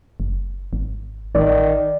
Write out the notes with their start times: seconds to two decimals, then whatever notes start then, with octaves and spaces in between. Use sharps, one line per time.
0.20 F#1
0.73 G#1
1.35 A1 D#3 D5